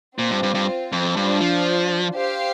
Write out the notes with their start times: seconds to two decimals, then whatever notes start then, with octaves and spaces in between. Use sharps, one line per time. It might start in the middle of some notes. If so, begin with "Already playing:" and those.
0.18 A#2 C4 F4 C5
0.31 G2
0.43 G2
0.55 G2
0.92 F2
1.16 G2 D4 F4 C5
1.41 F3
2.14 G4 C5 F5